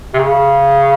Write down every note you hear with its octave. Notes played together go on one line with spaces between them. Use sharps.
C3
C#3